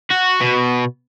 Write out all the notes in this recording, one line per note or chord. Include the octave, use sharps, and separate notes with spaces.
F#4
B2